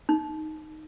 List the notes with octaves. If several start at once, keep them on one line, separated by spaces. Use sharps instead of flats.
D#4